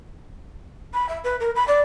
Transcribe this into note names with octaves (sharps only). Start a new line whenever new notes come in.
B5
E5
B4
A#4
B5
D5